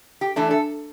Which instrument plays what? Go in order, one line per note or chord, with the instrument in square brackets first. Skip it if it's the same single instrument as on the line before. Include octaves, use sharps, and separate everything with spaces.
[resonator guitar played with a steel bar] G4
E3 A3 D4
A4